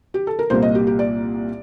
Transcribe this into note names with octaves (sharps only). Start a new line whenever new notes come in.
G4
A4
A#4
C2 A#2 G3 A#3 C5
D#5
G4
G4
D5